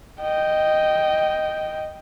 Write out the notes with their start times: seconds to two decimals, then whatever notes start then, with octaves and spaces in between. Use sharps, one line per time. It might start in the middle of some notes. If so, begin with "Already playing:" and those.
0.21 D#5 G5